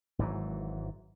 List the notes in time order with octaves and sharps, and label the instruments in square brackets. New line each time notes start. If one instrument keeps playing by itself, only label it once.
[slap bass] G#1 G#2 E3 F#3